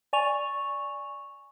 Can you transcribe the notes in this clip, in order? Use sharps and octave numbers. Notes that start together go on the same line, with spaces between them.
D5 G#5 C#6 F7